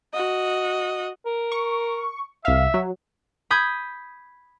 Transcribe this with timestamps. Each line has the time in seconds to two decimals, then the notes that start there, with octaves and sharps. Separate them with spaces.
0.14 F#4 D#5
1.26 A#4
1.52 C#6
2.45 C2 E5 F5
2.74 F#3
3.51 B5 D#6 G6 G#6